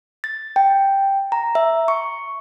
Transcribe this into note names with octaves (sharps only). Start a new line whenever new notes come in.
A6
G5
A#5
E5
C#6